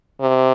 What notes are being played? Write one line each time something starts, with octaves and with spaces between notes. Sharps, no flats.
C3